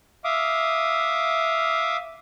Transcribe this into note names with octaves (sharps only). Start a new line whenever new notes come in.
E5 F5 D6 D#6